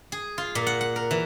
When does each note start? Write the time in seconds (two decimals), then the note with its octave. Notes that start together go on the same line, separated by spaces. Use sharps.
0.12 G#4
0.38 F4
0.55 A#2
0.67 F#5
0.81 F#5
0.96 A#4
1.11 E3